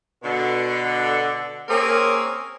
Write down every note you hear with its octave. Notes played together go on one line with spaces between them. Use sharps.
B2 D3
A#3 C4 C#4 G#4 A#4